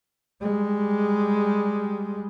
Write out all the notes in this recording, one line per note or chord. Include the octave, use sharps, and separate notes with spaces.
G3 G#3